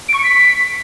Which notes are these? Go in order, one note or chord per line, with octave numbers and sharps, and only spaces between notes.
D7
C#6
C#7
B6